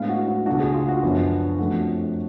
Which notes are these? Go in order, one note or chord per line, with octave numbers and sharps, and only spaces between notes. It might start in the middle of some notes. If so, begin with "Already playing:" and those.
Already playing: A2 G#3 B3 D4 F5
F#4
F#4
C#2 B2 A3 D4 F#4
G#4
F4
F#4
F#2 F3 B3 D4
F2 F3 A3 D4 F#4